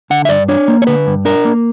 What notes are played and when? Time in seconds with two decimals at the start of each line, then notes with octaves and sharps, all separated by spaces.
0.10 D3 F#5
0.25 E5
0.29 G2 D5
0.48 D4 C#5
0.68 A#3
0.82 C#5
0.87 D3 B4
1.07 G2
1.25 D4 A#4
1.45 A#3